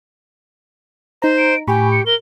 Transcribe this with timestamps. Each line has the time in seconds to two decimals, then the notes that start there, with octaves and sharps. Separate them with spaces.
1.22 D#4 C5 A#5
1.38 D7
1.68 A2 G4 G#5 B5 C#6
1.92 C#7
2.06 A#4 G7